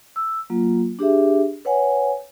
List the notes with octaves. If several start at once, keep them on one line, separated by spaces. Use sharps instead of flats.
E6
F#3 A#3 F4
D4 G4 G#4 E5
B4 C#5 F#5 G#5